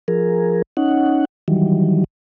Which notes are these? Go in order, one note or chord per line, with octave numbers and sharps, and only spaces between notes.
F3 G#4 A#4
C#4 D#4 F#5
D#3 E3 F#3 G3